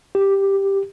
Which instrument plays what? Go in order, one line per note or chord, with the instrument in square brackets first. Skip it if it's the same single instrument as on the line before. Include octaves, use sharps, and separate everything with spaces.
[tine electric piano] G4